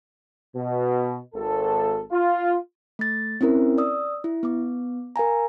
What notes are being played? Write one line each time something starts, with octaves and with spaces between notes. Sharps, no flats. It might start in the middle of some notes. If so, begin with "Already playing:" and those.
B2
G#1 A4
F4
A3 A6
C4 C#4 E4 A#4
D5 D#6 E6
E4
B3 D6
A#4 F5 G#5 A#5